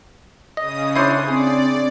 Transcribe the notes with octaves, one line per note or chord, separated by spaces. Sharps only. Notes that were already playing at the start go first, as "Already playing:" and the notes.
C#3 D#5 D#6
D4 E4 C5 C#5 C6
C4 G#4 D5